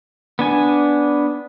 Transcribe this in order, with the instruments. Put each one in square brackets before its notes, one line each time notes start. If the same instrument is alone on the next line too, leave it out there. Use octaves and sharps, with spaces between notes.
[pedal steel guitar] B3 D4 G#5